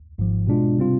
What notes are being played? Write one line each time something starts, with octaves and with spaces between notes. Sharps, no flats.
G#1 G#2 F3
B2 G#3 D4 F4
C3 G3 C4 F4